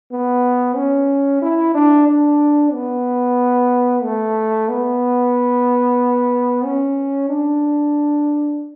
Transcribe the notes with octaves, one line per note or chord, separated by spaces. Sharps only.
B3
C#4
E4
D4
D4
B3
A3
B3
C#4
D4